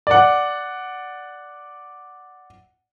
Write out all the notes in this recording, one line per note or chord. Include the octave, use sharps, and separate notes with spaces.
D5 F#5